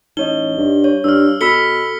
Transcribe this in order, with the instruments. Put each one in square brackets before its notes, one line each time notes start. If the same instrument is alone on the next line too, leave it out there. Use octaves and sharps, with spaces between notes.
[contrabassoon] A1 [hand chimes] D#4 C#5 D#5 [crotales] G7
[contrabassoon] G2
[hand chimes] C#5
[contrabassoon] G2 [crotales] E6 F6
[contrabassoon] B2 [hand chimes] A4 B5 E6 [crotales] B6 C#7 G7